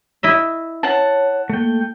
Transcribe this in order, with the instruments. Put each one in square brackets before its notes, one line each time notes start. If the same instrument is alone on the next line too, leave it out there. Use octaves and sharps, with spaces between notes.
[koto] E4 D#5 E5
[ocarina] C#5 [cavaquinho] F#5 A5
[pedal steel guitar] A3 G5 [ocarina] A#3